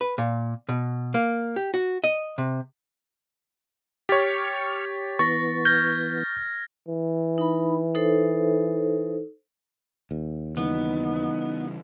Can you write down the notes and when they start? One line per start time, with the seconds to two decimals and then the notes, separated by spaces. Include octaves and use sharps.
0.01 B4
0.18 A#2
0.69 B2
1.14 A#3
1.56 G4
1.74 F#4
2.04 D#5
2.38 C3
4.09 G4 C#5 C#6 F6 A6 B6
5.19 E3 B3 C#6 A6 A#6
5.65 F6 G6 G#6 A#6
6.88 E3
7.38 D#4 B5
7.95 D#4 A4 C5
10.11 D#2
10.57 C#3 E3 G3 B3 D#4